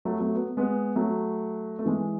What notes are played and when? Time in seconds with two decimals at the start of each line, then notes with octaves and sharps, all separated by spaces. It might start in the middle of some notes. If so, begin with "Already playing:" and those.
0.05 F#3 A3
0.20 F#3 A3
0.35 B3
0.57 G#3 B3
0.96 F#3 A3
1.79 A3
1.86 E3 G#3